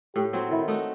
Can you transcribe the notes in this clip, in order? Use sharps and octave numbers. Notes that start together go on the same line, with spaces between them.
A2 G4
F#3 C4
D#3 E4
A3 D#4 F#4